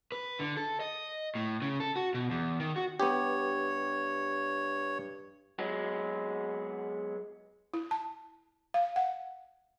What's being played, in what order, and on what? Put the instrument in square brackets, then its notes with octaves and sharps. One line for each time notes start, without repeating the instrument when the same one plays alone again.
[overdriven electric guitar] B4
D3
A4
D#5
A2
C#3
A4
F#4
B2
E2
D#3
F#4
[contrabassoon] G2 [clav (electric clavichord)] B3 G4 [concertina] C#5
[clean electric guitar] F#3 G#3 B3
[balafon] E4
A5
F5
F#5